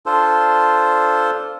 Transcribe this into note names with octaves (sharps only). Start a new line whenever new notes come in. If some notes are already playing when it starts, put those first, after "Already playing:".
D4 F4 A4 C5